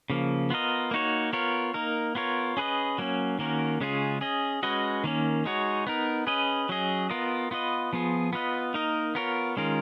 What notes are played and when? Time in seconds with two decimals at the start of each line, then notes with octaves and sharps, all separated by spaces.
0.10 C#3 F3 A#3
0.50 B3 F4 A#4 D#5
0.91 A#3 D#4 F#4 C#5
1.33 B3 F4 A#4 C#5
1.74 A#3 D#4 A#4
2.15 B3 F4 A#4 C#5
2.57 C#4 G#4 B4 D#5
2.98 F#3 A#3 C#4
3.39 D#3 A#3 C#4 F#4 A#4
3.81 C#3 G#3 C#4 F4 G#4
4.21 C#4 G#4 D#5
4.63 G#3 C#4 F#4 B4 D#5
5.04 D#3 A#3 C#4
5.45 G#3 D#4 F#4 C#5
5.87 B3 D#4 A#4
6.27 C#4 G#4 B4 D#5
6.69 F#3 C#4 G#4 D#5
7.10 B3 F4 A#4 D#5
7.51 B3 F4 B4 D#5
7.93 F3 B3 F4 G#4
8.33 B3 F4 B4 D#5
8.74 A#3 D#4 A#4 D#5
9.15 B3 F4 A#4 C#5
9.57 D#3 G#3 C#4 F4 A#4